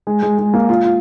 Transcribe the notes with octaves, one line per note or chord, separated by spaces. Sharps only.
G#3
G#3
G#3
A#3
F4
F4